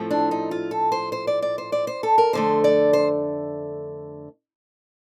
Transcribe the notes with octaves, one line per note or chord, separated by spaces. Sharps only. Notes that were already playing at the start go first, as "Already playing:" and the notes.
Already playing: A2 F3 A3 C4
D4
D#4
F4
A4
C5
C5
D5
D5
C5
D5
C5
A4
A#4
F2 D3 A3 C5
D5
C5